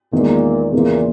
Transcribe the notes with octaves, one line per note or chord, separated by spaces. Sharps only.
E2 A#2 D#3 G#3
E2 A#2 C#3 E3 A#3